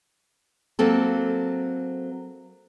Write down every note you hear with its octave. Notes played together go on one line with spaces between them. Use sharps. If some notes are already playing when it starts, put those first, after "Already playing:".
F#3 A#3 C4 A4